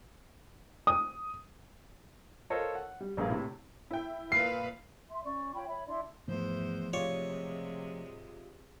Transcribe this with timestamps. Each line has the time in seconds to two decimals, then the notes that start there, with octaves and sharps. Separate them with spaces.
0.87 D#6
2.50 F4 A4 A#4 C5 C#5 D#5
2.75 F#5
3.00 G3
3.17 A#1 G2 A#3 G#4 F5
3.30 A2 C3 E4
3.91 E4 G5
4.32 A#2 B4 F5 C7
5.10 E5 C6
5.25 C#4 D5 C#6
5.54 F4 C#5 G5 B5
5.68 C#5 E5 B5
5.86 D4 E4 D5 C6
6.28 E2 G#2 F3 A3 C5
6.93 C3 G#3 F4 G4 C#5 D5